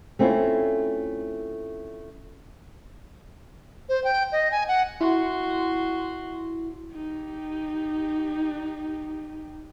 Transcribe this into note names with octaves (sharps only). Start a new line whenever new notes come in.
A3 C4 C#4 E4 F4
C5
G5
D#5
G#5
F#5
E4 F#4 C6
D#4 G4